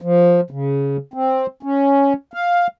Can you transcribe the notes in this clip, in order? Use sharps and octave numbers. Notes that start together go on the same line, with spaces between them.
F3
C#3
C4
C#4
F5